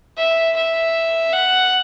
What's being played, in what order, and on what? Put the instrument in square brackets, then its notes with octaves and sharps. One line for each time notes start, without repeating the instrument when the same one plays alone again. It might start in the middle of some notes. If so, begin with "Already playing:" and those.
[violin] E5
E5
F#5